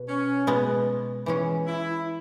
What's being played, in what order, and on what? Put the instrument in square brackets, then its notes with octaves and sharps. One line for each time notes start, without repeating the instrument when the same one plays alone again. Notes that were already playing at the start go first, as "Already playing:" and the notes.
Already playing: [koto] B2
[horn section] C#4
[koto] B2 G#3 B3
E3 G#3 C#4
[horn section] E4